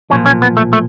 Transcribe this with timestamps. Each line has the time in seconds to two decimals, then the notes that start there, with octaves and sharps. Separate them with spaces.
0.10 B1 A#2 F3 C#4
0.26 C#4
0.42 B3
0.57 A3
0.73 A3